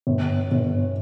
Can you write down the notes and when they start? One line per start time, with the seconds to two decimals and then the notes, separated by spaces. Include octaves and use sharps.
0.07 G1
0.52 G1